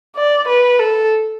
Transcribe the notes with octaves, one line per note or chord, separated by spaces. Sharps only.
D5
B4
A4